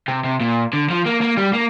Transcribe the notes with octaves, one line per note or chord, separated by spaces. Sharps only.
C3
C3
A#2
D3
F3
A#3
A#3
G3
A#3